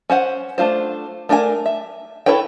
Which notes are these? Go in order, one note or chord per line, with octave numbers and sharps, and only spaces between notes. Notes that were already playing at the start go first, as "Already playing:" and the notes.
C#4 C5 F#5
A3 D4 F4 C5
A3 D4 A#4 B4 G#5
E5
E4 A4 B4 C#5 G5